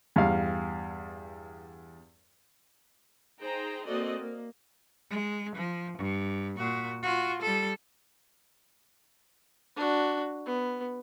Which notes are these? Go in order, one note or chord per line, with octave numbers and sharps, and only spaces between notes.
E2 G2 F5
D#4 G#4 C5 G5 A#5
A#3 C4 F#4 A4 D5 D#5
A#3
G#3
F3
G2
A#2 F#4
F4 F#4
G3 A4
D4 F#4
B3